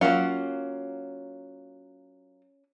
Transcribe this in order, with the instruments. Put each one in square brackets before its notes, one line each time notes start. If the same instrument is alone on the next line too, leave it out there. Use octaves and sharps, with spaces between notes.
[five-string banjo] F#3 A#3 F4 [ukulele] C#4 F#5